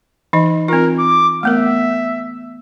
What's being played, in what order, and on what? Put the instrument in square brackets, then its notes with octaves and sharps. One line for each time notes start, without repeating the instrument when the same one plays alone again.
[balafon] E3 D#4 D#5
[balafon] C4 F4 [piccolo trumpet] A#4
[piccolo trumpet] D6
[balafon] A3 B3 A#4 [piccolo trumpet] E5